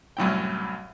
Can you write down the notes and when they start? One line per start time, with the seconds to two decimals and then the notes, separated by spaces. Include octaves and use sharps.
0.17 C2 F#2 A2 G5